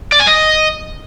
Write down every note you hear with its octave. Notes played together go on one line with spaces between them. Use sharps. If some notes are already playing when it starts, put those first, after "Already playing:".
D5
G#5
D#5